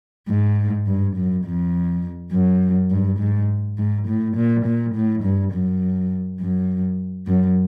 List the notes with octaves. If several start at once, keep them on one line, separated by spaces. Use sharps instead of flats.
G#2
G2
F#2
F2
F#2
G2
G#2
G#2
A2
A#2
A#2
A2
G2
F#2
F#2
F#2